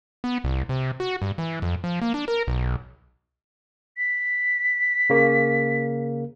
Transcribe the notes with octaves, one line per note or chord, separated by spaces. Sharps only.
B3
C2
C3
F#4
G2
E3
F2
F3
A#3
D4
A#4
B1
B6
C#3 A#3